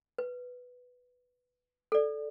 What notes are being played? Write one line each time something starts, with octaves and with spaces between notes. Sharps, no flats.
B4
A4 D5